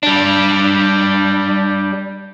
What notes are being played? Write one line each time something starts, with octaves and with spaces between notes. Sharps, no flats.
G3 D4